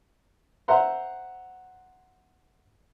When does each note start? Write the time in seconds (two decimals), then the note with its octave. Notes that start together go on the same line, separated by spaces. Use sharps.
0.68 C5 E5 F#5 A#5 C6